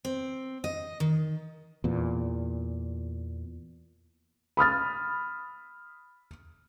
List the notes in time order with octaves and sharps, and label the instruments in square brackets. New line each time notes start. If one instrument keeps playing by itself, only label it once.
[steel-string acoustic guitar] C4
D#5
D#3
[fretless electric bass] E2 A#2
[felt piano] B5 D#6 F6 A6